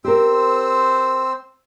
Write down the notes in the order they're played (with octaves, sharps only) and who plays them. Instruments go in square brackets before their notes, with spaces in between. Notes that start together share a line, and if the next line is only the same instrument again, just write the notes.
[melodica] C4 C5 E6 [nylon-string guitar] G4 A#4